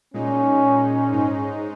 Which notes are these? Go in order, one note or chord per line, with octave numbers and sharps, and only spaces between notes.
A#2 G#3 C#4 D#4
G#2 G#3 D#4